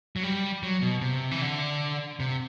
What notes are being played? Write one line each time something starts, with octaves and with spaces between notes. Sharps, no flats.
F#3
G3
F#3
B2
C3
E3
D3
C3